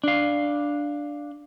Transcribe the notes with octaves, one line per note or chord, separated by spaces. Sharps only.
D4 F5